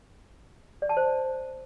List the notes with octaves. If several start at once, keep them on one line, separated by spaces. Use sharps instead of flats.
D5
A5
C5